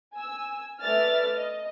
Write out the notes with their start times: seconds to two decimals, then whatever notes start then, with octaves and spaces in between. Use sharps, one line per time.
0.16 G#5 E6
0.81 A3 B4 D5 E5 F6 A6
1.33 D#5